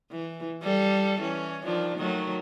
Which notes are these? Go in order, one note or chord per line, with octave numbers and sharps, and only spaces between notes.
E3
G3 A4
E3 C#4
D#3 F3 D4
D#3 F#3 A3